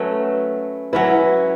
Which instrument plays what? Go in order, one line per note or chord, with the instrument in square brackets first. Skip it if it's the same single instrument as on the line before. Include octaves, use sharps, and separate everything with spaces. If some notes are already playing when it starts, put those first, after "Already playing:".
Already playing: [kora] F#3 A3 C#4 [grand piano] B4
[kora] F#3 C#4 E4 [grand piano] B4